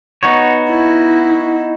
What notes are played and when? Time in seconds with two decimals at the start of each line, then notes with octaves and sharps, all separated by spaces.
0.23 B3 D#4 F#4 C#5
0.69 E4